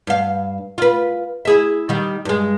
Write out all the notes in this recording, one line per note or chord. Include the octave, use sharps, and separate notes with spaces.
G2 F5
F4 B4
E4 G#4 E5
D#3 G3
G2 G#3